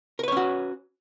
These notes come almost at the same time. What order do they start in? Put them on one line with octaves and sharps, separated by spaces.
A#4 B4 C#5 C#4 F#4